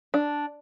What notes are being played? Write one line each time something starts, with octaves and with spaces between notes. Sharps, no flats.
D4